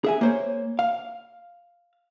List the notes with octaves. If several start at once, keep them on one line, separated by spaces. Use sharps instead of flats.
G#4 E5 G#5
A#3 C5 C#5
F5